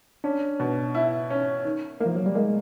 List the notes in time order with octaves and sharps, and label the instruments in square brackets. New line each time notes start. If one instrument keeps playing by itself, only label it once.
[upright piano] C#4 [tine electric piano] D4
[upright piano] B2
E4
C#4
D#3
A#3
[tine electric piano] F3
F#3
G3
[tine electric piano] G#3 [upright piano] A#3